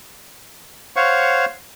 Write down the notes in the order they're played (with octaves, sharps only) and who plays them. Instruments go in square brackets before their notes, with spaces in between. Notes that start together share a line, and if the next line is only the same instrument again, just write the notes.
[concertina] C5 C#5 F5 F#5 C#6